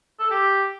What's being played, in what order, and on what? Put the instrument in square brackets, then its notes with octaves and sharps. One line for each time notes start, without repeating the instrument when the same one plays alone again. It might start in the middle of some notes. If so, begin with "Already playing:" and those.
[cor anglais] A4
G4